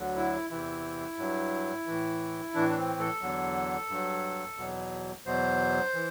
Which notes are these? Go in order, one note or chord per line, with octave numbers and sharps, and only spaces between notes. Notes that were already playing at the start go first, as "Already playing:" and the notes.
Already playing: D2 D3 F#3
E4
E2 C3 E3 E4
G2 F#3
A2 E3
A2 E3 D4
D4
C4
A4
E2 D3 F#3
G2 F#3
E2 B2 F#3
E2 B2 F#3 C5
E3